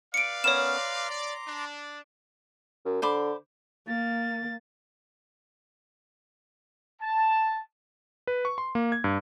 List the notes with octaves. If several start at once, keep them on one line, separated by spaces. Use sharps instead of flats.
B4 D5 F5 C#7 D7
B3 C#4 A#4 C#5 E7
A#5 C6 D6
D5
D4
F#2
D3 C5 B5 D6
A#3 A6
A5
B4
C#6
C6
A#3
G#6
G2